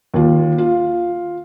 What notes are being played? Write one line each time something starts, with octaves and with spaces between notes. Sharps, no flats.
D#2 F4
F4